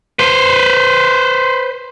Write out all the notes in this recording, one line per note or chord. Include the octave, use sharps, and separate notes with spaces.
B4 C5